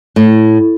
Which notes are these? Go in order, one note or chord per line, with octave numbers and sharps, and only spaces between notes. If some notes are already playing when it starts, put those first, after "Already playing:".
A2